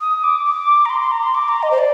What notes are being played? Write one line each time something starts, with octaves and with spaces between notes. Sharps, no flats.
D#6
D6
D6
A#5
C6
C6
A#5
C6
D6
A#5
D#5
C5
D5